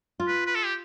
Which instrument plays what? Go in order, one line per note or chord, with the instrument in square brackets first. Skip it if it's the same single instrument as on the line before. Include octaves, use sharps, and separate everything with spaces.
[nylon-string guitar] F4
[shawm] B4
B4
A4
G4